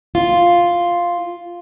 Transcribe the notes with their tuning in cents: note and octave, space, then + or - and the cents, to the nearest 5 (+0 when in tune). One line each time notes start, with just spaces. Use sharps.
F4 +0